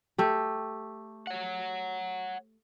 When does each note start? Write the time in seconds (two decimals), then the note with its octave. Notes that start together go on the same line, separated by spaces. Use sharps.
0.18 A3 G4
1.27 C#5 F#5